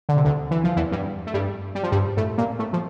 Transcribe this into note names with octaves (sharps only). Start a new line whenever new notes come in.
D3
C3
D2 D3
E3
F3
E2 E3
G2 G3
A3
G2 G3
G3
F3
G2 G3
A2 A3
A#2 A#3
A2 A3
F3